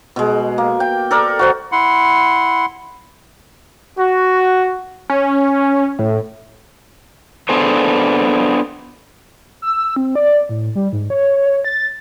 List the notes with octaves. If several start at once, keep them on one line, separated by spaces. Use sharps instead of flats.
B2 G#3
A#3
G5
A4 A#4 D5
F#4 C5 F#5
E4 F#5 C6
F#4
C#4
A2
B3 D4 G#4 A4 C5
E6
C4
D5
A2
G3
G#2
C#5
C#5
A6